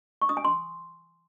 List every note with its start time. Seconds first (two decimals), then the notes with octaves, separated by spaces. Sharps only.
0.22 C#6
0.29 D#6
0.37 G#5
0.45 C6